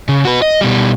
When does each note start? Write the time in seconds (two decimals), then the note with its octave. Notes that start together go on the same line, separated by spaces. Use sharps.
0.09 C#3
0.25 F#4 B4
0.42 D#5
0.61 B2 G3